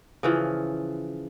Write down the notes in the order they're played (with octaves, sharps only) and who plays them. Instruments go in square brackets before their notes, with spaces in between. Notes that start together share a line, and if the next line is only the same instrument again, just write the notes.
[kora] C#3 E3 F3